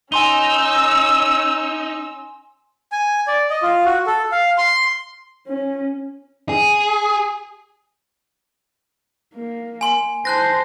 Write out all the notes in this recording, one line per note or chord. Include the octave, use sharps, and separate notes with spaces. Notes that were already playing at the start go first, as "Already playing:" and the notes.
C#4 D#4 G#5 C6 E6 G7
G#5
D5
D#5
F4
F#4
A4
F5
C6
C#4
G#4
A#3
G#5 C6
C5 A5 F#6 A#6